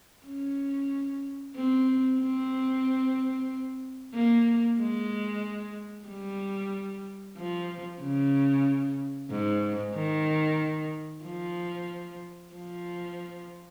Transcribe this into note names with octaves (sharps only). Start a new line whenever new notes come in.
C#4
C4
C4
A#3
G#3
G3
F3
C#3
G#2
D#3
F3
F3